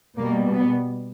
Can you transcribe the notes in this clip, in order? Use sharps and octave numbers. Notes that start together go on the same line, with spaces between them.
B2 G3 A#3
B3